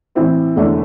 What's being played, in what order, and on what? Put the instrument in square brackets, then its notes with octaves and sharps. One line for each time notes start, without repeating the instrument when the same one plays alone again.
[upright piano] A2 E3 C4 E4
E1 E2 D3 A3 D4